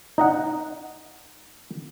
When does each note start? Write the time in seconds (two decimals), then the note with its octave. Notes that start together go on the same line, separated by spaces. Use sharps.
0.18 D#4 D#5 F#5